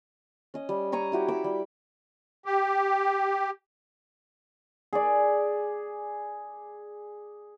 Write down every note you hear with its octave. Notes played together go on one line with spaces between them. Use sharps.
C#4 D#5
G3
C#5 A#5 C#6 D#6
E4 F#4 G4
B5 D6 E6
G3
G4
G#4 D5